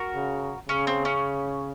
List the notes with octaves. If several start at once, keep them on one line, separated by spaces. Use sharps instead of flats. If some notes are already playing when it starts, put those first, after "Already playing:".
Already playing: F#4 A#4
C#3
C#3 C#4
C4
C#4